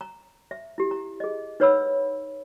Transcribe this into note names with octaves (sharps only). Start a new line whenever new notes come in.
A#5
E5
E4 G4
A#5
G#4 D#5
D#4 B4 C#5 F#5 B5 E6